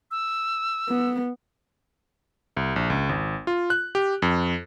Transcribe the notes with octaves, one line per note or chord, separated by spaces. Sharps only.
E6
B3
C2
A#1
C#2
G#1
F4
F#6
G4
F2